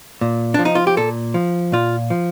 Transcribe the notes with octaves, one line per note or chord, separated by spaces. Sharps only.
A#2
F3 D4
D#4
F4
G4
A#2 A4
F3
A#2 F4
F3